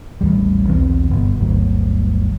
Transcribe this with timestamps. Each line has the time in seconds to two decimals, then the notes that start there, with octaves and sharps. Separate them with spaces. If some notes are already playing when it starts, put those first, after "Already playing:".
0.21 A1 D#2 G3
0.67 B1 E2 C4
1.11 G1 B2
1.40 G1 D2 F#3